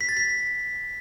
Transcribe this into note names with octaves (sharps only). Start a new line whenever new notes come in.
B6
A6
B6